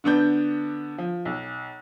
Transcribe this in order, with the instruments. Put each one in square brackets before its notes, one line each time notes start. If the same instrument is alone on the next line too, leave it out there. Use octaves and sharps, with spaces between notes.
[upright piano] D3 B3 D4 G6
F3
B1